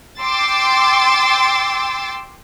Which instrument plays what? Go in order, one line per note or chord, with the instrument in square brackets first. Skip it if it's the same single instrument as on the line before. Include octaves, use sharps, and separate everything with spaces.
[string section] G5 C6 D6 E6 A6